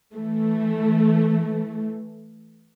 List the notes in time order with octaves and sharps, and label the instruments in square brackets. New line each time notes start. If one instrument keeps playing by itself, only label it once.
[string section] E3 A3